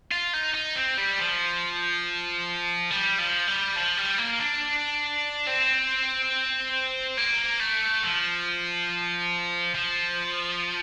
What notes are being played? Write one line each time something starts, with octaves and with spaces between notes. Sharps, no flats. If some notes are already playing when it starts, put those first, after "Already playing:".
F4
D#4
D#4
C4
G3
F3
G3
F3
G3
F3
G3
A#3
D4
C4
A#3
A3
F3
F3